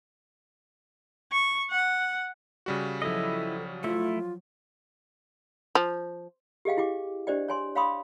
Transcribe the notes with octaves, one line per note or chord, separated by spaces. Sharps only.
C#6
F#5
C#3 G3 F#4
F3 F#3 E4 A4 D#5
A3 E4 F4
F3
G4 G#4 D#5 F5 G5
E4 G4 G5 D6
D4 G4 C5 D5 D#5 G5
C#5 G#5 C6
C#5 F5 G5 B5 C6 D#6